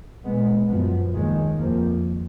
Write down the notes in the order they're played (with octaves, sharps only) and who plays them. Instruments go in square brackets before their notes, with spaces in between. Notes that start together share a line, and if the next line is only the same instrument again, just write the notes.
[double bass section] A#2 G#3 B3
F#2 F3 B3
D#2 D#3 G#3
F2 F3 A#3